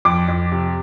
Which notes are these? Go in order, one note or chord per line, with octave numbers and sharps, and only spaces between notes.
F2 D6
F2
C3